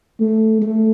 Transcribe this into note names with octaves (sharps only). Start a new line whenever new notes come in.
A3
A3